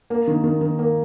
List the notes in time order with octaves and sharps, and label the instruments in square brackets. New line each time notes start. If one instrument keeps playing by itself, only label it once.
[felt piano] A#3
D#3
D#3
D#3
A#3